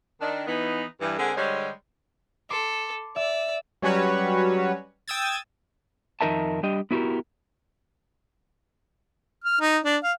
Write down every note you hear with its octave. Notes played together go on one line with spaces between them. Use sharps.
D#3 D4
E3 B3 D#4
G2 E3
D3 G#3 C4 G#4 A#4 F#5
D3 G3 G#3 C5 C#5
A4 C6 D6
D5 E5 E6
F#3 G3 C#4 F#4 B4 C#5
G5 D#6 E6 G#6 A6
F2 D#3 D#4 A#4 E5 A5
G3 D4 G4 D#5
B3 E4 F#4 G4 A#4
F6
D#4
D4
F5